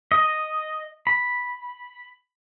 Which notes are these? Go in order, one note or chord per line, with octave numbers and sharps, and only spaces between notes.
D#5
B5